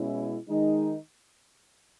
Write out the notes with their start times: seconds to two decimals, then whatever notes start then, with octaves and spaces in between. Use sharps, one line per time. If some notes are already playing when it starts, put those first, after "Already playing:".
Already playing: B2 G#3 C#4 E4
0.48 D#3 G#3 D#4